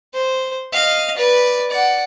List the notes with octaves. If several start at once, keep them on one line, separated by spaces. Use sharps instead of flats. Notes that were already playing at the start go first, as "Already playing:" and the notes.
C5
D#5 F5
B4 D5
D5 F#5